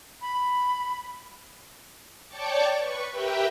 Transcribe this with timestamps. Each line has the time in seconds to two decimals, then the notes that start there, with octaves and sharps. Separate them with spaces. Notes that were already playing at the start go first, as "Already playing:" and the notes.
0.21 B5
2.28 C#5 D5 G5 A5 C#6 D6
2.78 B4 C#6
3.11 G4 A#4 B4 E5 G5